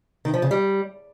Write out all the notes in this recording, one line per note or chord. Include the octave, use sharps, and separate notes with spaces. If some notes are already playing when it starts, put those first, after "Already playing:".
D#3
F3
C#3
G3